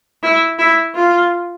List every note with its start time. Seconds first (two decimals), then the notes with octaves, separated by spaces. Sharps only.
0.23 E4
0.59 E4
0.95 F4